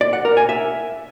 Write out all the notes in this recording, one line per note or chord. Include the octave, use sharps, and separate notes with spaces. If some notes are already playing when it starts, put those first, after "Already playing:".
D5
F#5
A#4
G#5
E5